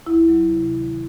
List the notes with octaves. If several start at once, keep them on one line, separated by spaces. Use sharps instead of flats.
D2 E4
F#3
C3
D#3